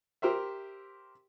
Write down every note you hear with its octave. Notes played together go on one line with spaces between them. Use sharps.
G4 A#4 C5 E5